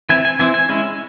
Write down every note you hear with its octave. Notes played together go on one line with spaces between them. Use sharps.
E3 C4 E4 G#5
G#5
E3 C4 E4 G#5
G#5
G#3 C#4 E4